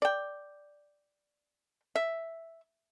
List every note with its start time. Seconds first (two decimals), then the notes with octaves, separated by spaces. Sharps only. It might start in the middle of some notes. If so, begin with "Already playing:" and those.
0.02 D5 G5
1.95 E5